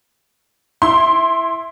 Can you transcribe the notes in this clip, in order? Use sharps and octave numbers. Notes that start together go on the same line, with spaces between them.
E4 C6